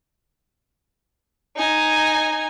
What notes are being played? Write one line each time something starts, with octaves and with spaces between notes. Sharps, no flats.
D#4 G#5